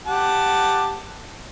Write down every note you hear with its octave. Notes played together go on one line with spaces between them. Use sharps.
G4 F#5 A5